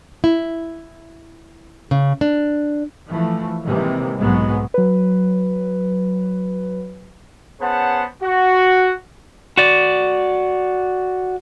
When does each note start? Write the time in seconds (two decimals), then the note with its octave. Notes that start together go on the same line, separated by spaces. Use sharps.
0.24 E4
1.91 C#3
2.21 D4
3.09 E3 F3 A3
3.66 C3 D#3 E3 G3 G#3 A#3
4.20 B1 G#2 F#3 G#3 B3
4.74 F#3 B4
7.61 B3 C#4 G#4 C5 F#5 A5
8.23 F#4
9.57 F#4 D5